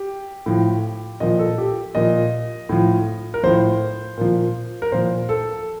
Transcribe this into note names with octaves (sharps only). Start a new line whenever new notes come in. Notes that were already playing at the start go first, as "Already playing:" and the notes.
Already playing: G4
A2 F3
A#2 F3 D#5
A4
G4
A#2 F3 D#5
A2 F3
A#4
A2 F3 C5
A#2 F3
A#4
A#2 F3 C5
A4